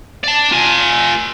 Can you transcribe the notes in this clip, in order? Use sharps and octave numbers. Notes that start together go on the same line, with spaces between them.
D5 A5
F4 G#5